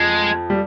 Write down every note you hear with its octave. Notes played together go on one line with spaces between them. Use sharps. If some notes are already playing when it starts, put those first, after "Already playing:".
Already playing: F2 F3 G#3
G3